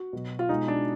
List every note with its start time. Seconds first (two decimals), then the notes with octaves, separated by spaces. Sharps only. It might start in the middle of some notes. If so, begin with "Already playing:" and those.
Already playing: F#4
0.13 B2 F#3
0.39 F4
0.49 B2 G#3 D#4
0.68 D4